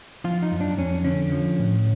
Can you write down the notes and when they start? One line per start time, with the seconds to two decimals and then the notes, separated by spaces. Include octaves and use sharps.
0.24 F3 F4
0.42 D#4
0.52 F#2
0.60 D4
0.78 F2 C#4
1.04 D3 C#4
1.32 F3
1.59 A2